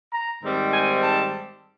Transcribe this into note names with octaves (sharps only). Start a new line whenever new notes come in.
A#5
G#2 D#3 G3 C4
G#5
A5